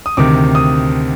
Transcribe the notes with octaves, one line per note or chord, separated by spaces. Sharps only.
D#6
D2 C3 D#3 D6
D#6